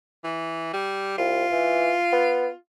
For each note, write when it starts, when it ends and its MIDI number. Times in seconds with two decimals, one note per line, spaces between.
0.24 0.73 52
0.73 1.13 55
1.18 1.45 36
1.18 2.54 65
1.51 1.95 52
2.12 2.48 59